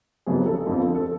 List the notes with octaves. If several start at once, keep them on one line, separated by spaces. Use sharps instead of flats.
F1 F2 C#3 F#3 B3 G#4
A4
F2 D3 F3 B3 A4
A4